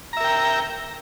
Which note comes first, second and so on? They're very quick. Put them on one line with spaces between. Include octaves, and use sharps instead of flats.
A#5 E5 A#4 G5